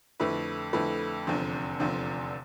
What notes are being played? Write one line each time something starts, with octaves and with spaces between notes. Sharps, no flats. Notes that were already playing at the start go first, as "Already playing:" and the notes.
F2 D3 A3 E4 B4
F2 D3 A3 E4 B4
F1 E2 D3 F3 C4
F1 E2 D3 F3 C4